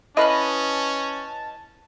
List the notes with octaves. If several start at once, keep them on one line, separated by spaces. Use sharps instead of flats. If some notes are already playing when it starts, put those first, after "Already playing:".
C#4 E4 B4 D#5 F5 A5 B5